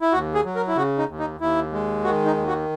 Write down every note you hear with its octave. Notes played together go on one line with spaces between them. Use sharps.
E4
D#2 F#4
G#4
F#3
A#4
E4
C#3 F#4
D#4
D#2
D#4
D#2 E4
G#3
D#3 F#4
D#4
D#2
F#4